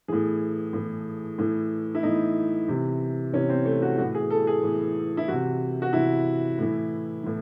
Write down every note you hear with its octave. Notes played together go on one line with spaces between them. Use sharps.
A2 E3 G#4
A2 E3
A2 E3
E4
A2 E3 D#4
C3 E3
C3 E3 C#4
C4
A3
F#4
A2 E3 F#4
G#4
A4
G#4
A2 E3
E4
C3 E3 F#4
F#4
C3 E3 E4
A2 E3
A2 E3